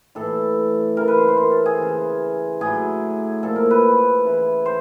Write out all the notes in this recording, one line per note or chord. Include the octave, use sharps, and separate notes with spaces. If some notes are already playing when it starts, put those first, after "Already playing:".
A2 E3 A4
C#3 E3 A#4
B4
C5
C5
A#4
A4
G#4
C#3 E3
A2 F#3 G#4
A#2 F3 A4
A#4
B4
C#3 E3
C5